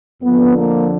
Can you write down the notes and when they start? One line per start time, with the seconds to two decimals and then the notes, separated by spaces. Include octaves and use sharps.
0.22 F2 D3 F3 B3
0.57 A#3